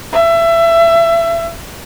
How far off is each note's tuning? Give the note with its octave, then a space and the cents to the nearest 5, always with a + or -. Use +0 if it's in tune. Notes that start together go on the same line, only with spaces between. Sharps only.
E5 +25